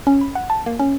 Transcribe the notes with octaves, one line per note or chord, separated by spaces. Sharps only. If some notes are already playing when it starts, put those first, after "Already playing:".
C#4
B5
F#5
A5
A#3
C#4